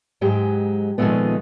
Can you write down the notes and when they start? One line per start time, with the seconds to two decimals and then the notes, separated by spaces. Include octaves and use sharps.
0.21 G#2 F#3 G#3 G4
0.98 A#2 D#3 F3 G#3 A3 B3